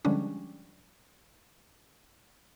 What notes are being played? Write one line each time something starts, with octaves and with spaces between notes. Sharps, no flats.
D3 F3 G3 G#3 C#4 D4